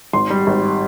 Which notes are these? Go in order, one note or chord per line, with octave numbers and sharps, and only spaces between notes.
G#1 C6
G3
G#1